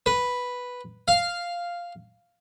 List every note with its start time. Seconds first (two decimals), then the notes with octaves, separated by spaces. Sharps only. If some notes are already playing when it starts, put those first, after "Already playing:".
0.06 B4
1.08 F5